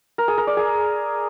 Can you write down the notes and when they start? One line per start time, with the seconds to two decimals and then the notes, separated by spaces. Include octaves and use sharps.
0.18 A#4
0.28 G#4
0.38 A#4
0.47 D5
0.57 G#4